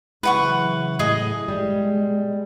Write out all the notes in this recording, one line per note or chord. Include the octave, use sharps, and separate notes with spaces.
C#3 E3 F#3 E4 B4 F#5 C#6
A2 G#4 D#5
B2 G3 G#3